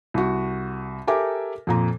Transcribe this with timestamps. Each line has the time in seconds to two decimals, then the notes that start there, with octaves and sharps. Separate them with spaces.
0.14 C2 F#4
1.07 G4 A4 A#4 E5 G#5 D6
1.67 F2 A#2 A#5